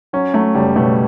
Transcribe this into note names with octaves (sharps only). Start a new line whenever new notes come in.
F#3 C#4
F#3 A3
F#1 G3
B2 A3